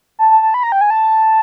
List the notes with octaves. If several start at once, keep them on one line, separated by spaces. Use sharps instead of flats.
A5
A5
A5
B5
A#5
G5
G#5
A5